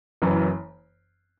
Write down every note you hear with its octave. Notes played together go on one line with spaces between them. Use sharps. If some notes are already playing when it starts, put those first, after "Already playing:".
F#1 F#2 E3